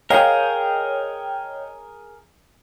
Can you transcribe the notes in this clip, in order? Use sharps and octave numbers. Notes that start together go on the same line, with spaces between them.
G#4 A#4 C#5 D#5 F5 G5